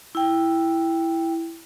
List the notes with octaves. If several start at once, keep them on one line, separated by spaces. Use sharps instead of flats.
E4 G5